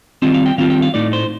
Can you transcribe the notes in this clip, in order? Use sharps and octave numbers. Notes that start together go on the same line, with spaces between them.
D#3 G3 C4 F4 D#5
F5
G5
D#3 G3 C4 F4 F5
G5
F5
A2 A3 D#4 D5
C5